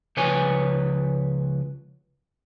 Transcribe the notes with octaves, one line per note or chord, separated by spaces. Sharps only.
C#2 F3 B4 C#5 G#5